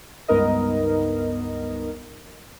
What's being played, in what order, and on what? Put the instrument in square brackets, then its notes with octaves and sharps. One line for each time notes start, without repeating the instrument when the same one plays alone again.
[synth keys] C#2 G2 B3 D#4 A#4 D#5